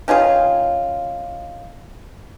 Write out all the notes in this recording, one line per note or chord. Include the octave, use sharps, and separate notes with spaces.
D#3 C#4 F4 G#4